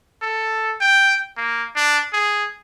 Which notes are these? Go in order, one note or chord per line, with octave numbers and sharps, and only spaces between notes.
A4
G5
A#3
D4
G#4